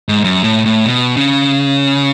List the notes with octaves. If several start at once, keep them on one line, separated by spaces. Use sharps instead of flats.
G#2
F#2
A2
A2
B2
C#3